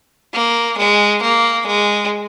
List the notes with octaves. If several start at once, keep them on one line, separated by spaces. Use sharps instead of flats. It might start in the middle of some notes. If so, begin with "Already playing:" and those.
A#3
G#3
A#3
G#3